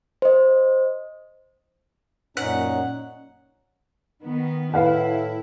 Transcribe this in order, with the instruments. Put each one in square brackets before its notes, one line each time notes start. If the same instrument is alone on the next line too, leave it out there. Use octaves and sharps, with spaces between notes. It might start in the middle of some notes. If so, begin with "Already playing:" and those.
[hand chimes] C5 D#5
[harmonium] F#2 A#2 D#4 [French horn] C#4 [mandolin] F#5
[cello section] D#3 B3
[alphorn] A2 [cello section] E4 [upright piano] B4 F5 F#5